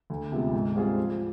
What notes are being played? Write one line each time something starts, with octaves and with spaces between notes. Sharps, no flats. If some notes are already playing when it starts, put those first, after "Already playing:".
D2
C3 F3 G#3 B3
G#2
G3 C4 F4 G#4
F3